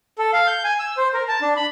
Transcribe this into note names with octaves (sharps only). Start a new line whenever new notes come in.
A4
F5
G6
G#5
E6
C5
A#4
A5
D4
B5